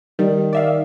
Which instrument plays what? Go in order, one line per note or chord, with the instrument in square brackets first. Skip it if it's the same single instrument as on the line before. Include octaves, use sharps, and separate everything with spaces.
[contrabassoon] D#3 [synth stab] G3
[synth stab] D5 E5 F5